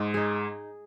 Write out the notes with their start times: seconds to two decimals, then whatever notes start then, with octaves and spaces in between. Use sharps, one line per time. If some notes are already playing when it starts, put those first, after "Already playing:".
Already playing: G#2 G#3
0.14 D#4 G#4